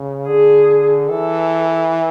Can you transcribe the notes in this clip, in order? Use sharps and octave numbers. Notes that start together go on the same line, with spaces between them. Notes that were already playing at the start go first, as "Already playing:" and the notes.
Already playing: C#3
D3 G#4
E3 A4